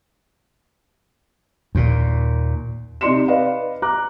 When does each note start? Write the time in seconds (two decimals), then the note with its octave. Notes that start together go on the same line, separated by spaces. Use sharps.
1.75 D#2 A#2
3.01 C3 D#4 D5 C6 C#7 E7
3.28 B4 D5 D#5 F5
3.82 A#5 D6 F#6